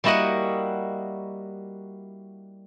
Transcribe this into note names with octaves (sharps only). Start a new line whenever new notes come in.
G3 A#3 E4 F#4 D#5 F#5